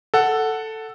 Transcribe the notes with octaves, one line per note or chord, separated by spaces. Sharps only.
A4 F#5